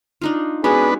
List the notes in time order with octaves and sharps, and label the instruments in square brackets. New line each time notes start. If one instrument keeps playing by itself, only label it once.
[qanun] D4 D#4 F4
[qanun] G#3 C#4 F#4 [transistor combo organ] B3 D4 B4 [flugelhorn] G#4